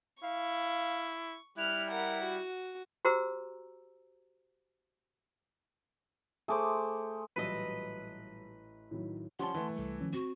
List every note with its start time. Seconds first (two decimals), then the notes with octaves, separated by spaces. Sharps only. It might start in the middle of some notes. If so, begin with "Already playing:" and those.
0.23 E4 F5 C#6
1.58 G3 E4 F6 F#6
1.91 A#4 F#5
2.24 F#4
3.05 F#4 G4 C5 A#5 E6
6.48 A3 G#4 C5 D6
7.36 A1 A#2 F#3 G3 B4 D#5 A5 E6
8.91 A2 D#3 F#3
9.39 F3 G3 C#4 F#5 A5 C6
9.54 E3 A3
9.76 C2 G3 A4
10.01 D#3 F3 C#4
10.13 C4 F#4